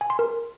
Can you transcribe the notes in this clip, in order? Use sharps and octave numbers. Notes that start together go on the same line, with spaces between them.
G#5
C6
A#4